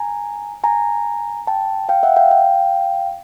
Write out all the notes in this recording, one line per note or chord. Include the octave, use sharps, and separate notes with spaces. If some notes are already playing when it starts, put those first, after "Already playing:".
Already playing: G#5 A#5
G#5 A#5
G5 A5
F5 G5
E5 F#5
F5 G5
F5 G5